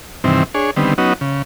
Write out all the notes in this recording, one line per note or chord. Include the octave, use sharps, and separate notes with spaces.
G2 C3 D#3 E3 C4
D4 G#4 C#5
D3 D#3 G3 B3 C4
F#3 B3 C#4 D#4 F#4
C#3